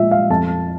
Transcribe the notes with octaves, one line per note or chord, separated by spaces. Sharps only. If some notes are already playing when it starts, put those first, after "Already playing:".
Already playing: A#2 F3 G#3 E5
F5
F2 A5